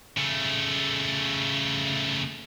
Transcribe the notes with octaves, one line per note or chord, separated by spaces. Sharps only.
C#3 A3